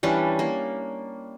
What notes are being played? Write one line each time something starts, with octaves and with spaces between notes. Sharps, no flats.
E3 G3 C#4 D4
A#3